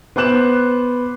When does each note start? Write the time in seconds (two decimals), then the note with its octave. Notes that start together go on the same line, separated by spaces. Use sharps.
0.16 B3 C5 D6 F#6 E7